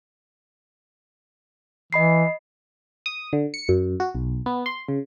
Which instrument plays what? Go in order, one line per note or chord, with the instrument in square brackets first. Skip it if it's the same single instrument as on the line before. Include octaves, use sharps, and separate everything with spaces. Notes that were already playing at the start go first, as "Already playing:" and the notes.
[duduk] E3 [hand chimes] D#5 B5 C7
[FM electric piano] D#6
D3
C#7
F#2
F#4
B1
B3
C6
C#3